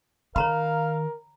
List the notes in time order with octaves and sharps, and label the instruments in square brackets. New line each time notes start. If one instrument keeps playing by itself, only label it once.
[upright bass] D#3 [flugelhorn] A#4 [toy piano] C#5 A#5 B5 [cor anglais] F5